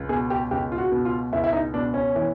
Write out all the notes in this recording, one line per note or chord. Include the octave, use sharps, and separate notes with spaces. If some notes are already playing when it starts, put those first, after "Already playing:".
Already playing: C#2
B2 G#4
G4
C#2 G4
F4
F#4
B2
F4
C#2 E4
E4
D#4
B2 D4
C#4
E3